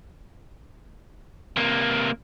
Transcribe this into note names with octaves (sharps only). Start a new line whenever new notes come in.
C3 A#3